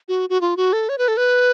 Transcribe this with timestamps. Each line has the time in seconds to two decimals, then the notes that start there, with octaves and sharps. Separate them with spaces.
0.08 F#4
0.30 F#4
0.41 F4
0.57 F#4
0.73 A4
0.89 C#5
0.98 B4
1.08 A4
1.17 B4